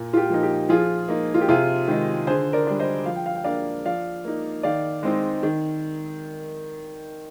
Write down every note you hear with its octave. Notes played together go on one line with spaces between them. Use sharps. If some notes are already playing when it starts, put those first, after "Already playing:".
Already playing: A#2
F4
G4
F3 A#3 D#4
G4
F3 F4 G#4
A#3 D#4
F4
G4
C3 F4 G#4
D#3 G#3 D#4
D3 G#4 C5
A#4 D5
G3 D4
C5 D#5
F3 F5
G5
F5
G5
A#3 D4 D5 F5
F3 D5 F5
A#3 D#4
D#3 D5 F5
G#3 C4 D#4
D#3